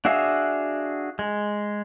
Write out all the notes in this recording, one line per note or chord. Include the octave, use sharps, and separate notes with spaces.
D4 F#4 G#4 E5 F5
G#3